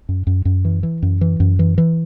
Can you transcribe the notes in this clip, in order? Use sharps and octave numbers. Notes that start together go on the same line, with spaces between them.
F#2
F#2
F#2
E3
E3
F#2
E3
F#2
E3
E3